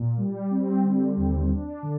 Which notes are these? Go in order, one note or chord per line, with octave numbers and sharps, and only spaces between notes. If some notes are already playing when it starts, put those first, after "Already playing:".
Already playing: A#2
G3
C4
D3
D#2
D4
D3